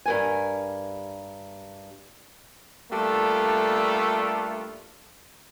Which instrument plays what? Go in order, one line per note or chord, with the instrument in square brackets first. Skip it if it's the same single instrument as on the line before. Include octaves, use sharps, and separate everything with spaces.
[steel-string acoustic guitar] G2 A#4 G#5
[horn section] G3 A3 A#3 D4 F4 A4